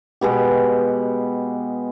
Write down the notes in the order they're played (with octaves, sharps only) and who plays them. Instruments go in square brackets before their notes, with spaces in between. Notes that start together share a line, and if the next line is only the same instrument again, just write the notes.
[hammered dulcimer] B2 G#3 B3 G4